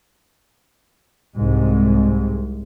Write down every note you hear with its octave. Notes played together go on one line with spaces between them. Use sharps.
C2 G#2 C3 G#3